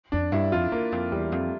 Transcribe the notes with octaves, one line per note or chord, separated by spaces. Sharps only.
F2 D4
G2 E4
F2 F4
E2 A#3
F2
E2 G3
F2